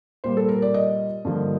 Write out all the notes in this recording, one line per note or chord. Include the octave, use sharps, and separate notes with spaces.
A#2 G3 A#3 C5
A4
A#4
D5
D#5
G2 D3 F3 A#3